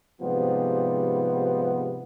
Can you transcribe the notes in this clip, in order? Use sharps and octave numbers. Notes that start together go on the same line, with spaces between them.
G#2 C3 F3 G3 B3